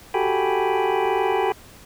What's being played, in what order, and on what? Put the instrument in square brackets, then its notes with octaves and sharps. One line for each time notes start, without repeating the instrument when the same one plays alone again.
[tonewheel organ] F#4 G4 A4 G5 G#5 B5